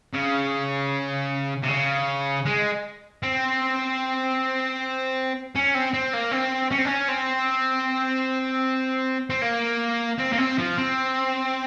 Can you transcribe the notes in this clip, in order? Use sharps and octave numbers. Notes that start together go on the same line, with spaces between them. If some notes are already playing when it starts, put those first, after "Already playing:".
C#3
C3
C#3
G#3
C4
C#4
C4
C4
A#3
C4
C#4
C4
C#4
C4
C4
A#3
C4
A#3
C4
F3
C4